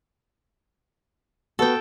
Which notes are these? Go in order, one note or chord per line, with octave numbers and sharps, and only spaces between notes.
B3 F#4 A4 G5